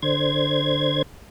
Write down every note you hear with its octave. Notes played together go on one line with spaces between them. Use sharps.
D3 C5 G#6